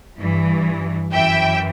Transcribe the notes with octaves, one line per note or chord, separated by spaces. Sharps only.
G2 E3
F#2 E3 E5 G5